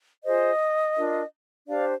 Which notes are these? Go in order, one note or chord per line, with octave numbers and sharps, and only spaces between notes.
F4 G#4 C5 D#5
D4 F4 A#4
D4 G4 C5 D5 F5